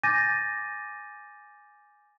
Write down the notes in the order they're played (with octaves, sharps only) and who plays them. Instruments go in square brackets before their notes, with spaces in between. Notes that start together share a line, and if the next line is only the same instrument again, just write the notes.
[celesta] G#5 D6 G6 A6 A#6 D#7